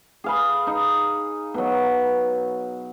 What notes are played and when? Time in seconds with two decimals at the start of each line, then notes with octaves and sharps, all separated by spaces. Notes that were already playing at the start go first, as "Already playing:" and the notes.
0.24 G#4 F5 B5
0.67 D#4
1.54 B2 F#3